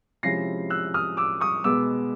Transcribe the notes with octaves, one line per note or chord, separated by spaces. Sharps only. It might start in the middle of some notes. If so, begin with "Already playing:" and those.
C3 F3 G#3 C#4 E4 A#6 C7
E6 F#6
D#6 F6
D6 E6
C#6 D#6
B2 G#3 B3 D6 E6